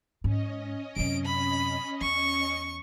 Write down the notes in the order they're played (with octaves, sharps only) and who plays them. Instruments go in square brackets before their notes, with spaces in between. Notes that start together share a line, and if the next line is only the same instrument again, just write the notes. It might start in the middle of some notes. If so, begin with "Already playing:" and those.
[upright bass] G#2 [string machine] C#4 D#5
[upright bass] F#2 C3 [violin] D7
[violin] B5
[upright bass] E2 [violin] C#6